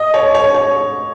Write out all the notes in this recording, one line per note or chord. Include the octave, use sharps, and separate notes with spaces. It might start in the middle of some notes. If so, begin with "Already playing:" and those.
Already playing: D#5
C#5
C#5
C#5